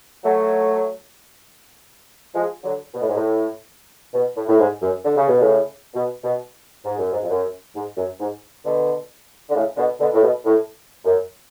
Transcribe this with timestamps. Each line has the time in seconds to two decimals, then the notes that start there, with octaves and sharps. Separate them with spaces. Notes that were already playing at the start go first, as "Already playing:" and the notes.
0.23 F#3 A3
2.34 F3 G#3
2.64 D3 F#3
2.93 B2
3.01 A2
3.08 G#2
3.15 A2
4.14 B2
4.36 A2
4.47 A2
4.59 G#2
4.81 F#2
5.04 D3
5.16 C#3
5.27 B2
5.40 A2 C#3
5.94 B2
6.24 B2
6.84 G#2
6.98 F#2
7.11 G#2
7.22 F2
7.29 F#2
7.74 G#2
7.97 F#2
8.19 G#2
8.64 B2 D3
9.49 D3
9.54 A2 C#3
9.77 B2 D3
9.99 B2 D3
10.13 A2
10.22 B2
10.45 A2
11.05 F#2